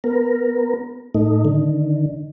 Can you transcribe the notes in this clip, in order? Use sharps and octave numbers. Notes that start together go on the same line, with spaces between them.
B3 A#4
A2 A3 D#4
D3 D#3